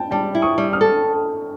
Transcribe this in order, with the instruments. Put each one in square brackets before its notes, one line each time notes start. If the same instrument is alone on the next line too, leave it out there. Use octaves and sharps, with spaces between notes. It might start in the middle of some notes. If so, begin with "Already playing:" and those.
Already playing: [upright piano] G5 A5
[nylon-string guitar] G3 [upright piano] G5 A5
[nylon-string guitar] E4
[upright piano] C#6 D#6
[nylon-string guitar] G3
[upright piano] D#6 F6
[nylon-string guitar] A4